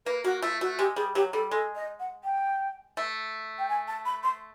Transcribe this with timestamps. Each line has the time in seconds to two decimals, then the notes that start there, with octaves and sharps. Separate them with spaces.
0.06 A#3 B4
0.24 A#3 F#4
0.42 A3 F4
0.61 A3 F#4
0.79 G#3 G4
0.96 G3 G#4
1.15 F#3 G4
1.33 G3 A4
1.51 G#3 A4
1.75 D#5
2.00 F#5
2.24 G5
2.97 A3
3.59 G5
3.69 G#5
3.88 A5
4.06 B5
4.23 C6